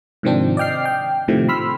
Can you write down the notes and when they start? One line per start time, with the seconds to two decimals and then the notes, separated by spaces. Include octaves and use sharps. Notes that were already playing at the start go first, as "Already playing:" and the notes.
0.23 G#2 C3 D#3 F3 C4 D4
0.57 D5 D#5 G5 F6 C7
0.85 G5
1.28 A2 C3 D#3 F3 A3
1.49 B5 C6 E6 F6 B6